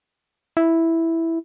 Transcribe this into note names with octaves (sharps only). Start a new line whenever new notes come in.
E4